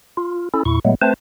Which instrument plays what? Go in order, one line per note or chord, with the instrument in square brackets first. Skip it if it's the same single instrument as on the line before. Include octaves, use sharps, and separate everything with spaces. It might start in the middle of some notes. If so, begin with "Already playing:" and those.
[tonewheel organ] F4
C#4 E4 A4
E2 A#2 E4 C#6
A#2 F#3 G#3 A3 B3
A3 C4 B4 C5 A5